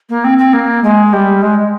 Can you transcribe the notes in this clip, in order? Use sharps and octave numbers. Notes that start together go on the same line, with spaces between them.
A#3
C4
C4
A#3
G#3
G3
G#3